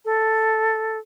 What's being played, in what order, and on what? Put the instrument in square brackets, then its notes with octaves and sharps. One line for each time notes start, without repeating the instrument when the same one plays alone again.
[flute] A4